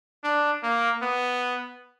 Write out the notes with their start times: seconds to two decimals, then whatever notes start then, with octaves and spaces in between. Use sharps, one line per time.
0.24 D4
0.63 A#3
1.02 B3